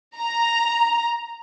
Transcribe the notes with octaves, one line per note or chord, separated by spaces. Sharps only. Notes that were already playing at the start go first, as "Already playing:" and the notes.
A#5